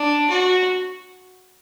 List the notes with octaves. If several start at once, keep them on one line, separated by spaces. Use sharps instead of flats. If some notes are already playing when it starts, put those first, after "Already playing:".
Already playing: D4
F#4